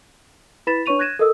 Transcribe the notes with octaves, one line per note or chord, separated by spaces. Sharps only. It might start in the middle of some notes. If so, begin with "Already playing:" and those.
E4 B4 B5 A6 B6 E7
D4 B4 C#5 C#6 D#7 F7
F#6 G#6 A#6 D#7 E7
A4 A#4 D#5 D#6 E6